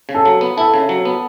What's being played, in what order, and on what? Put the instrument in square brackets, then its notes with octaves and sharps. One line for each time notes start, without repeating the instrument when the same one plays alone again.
[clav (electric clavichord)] C#3
[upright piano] A4
[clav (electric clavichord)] F#3
B3
[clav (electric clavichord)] E4 [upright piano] A4
[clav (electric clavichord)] C#3
F#3
B3